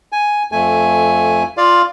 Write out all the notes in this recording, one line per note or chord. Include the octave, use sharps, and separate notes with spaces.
G#5
F2 A3 G#5
F4 D5 F5